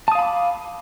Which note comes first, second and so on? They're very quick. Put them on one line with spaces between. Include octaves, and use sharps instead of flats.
A5 D#6 F5 B5 D6